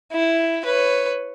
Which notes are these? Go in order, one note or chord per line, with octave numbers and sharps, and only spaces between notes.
E4
B4 C#5